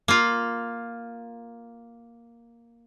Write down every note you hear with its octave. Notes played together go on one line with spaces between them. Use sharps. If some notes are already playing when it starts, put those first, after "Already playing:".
A#3 F4